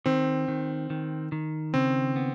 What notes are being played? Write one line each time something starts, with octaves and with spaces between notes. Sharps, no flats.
D#3 C4
D#3
D#3
D#3
C#3 C4
B3